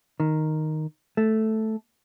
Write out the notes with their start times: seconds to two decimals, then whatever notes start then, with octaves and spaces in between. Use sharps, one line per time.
0.20 D#3
1.17 A3